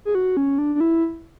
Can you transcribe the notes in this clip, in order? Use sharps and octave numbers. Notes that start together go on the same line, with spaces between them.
G#4
F#4
C#4
D4
D4
E4